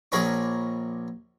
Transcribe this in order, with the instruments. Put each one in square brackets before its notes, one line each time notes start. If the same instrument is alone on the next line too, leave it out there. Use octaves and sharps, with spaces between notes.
[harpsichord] A#1 G#4 A#4 C#5 B5 D6